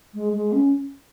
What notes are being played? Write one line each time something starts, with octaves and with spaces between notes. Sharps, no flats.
G#3
G#3
C#4